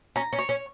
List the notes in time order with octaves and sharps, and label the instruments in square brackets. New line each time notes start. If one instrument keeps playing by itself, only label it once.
[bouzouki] C#4 [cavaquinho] A#5
[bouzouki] C#4
[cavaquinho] C#5
[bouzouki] C#4